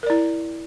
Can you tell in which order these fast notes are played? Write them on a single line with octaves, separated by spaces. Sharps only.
A#4 D5 E4